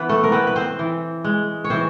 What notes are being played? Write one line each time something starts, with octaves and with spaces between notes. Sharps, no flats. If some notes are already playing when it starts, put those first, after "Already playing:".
Already playing: E3 B3 B4
A3 A4
A#4
B3 C4 B4
B4
C4 C5
E3
G#3
C#5
E3 C4 C5